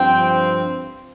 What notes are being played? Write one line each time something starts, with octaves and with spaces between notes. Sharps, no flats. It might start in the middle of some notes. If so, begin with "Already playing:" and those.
Already playing: G2 F3 C4 G5